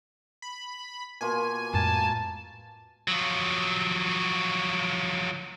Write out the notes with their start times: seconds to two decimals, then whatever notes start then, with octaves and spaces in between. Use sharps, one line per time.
0.42 B5
1.21 B2 A#3 F4 G#5
1.73 F2 A2 G#3 A5
3.08 F3 F#3